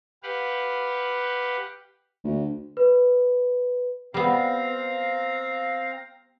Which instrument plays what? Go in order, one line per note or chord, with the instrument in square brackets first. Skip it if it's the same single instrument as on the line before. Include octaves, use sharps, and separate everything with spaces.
[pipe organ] G4 B4 F5 F#5
[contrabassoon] D2
[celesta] B4
[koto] G3 B3 [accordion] C4 F5 A#5